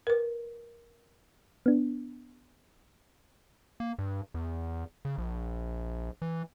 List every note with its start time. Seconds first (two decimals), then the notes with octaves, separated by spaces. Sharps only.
0.07 A#4 B4
1.66 B3 D4
3.80 A#3
3.99 G2
4.34 E2
5.05 C#3
5.18 A#1
6.22 E3